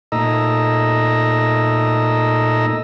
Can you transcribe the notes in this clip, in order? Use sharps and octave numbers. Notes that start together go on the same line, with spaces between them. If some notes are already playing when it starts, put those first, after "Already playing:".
A#2 A3 D#4 D#5 A#5 E6